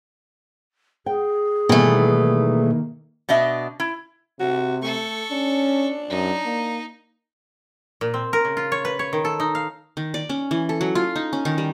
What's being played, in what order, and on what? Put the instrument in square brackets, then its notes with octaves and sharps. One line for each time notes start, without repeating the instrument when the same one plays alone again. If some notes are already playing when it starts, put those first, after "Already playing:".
[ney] G#4 [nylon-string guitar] G5
[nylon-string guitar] B2 G3 [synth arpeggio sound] D#3 A#3 [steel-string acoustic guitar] E3 A3
[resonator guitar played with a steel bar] B2 D4 D#5 E5
E4
[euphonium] C3 [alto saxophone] F#4
[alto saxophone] A3 [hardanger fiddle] A4 C#6
[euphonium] C#4 [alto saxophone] D4
[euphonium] F#2 [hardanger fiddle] D#4
[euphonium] A#3
[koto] A#2
C4
A#4
C#3
F4
C#5
B4
C#5
D#3
A4
D#4
F5
[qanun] D#3
D5
C#4
E3
A4
F#3
F4
D#4
C#4
D#3
G3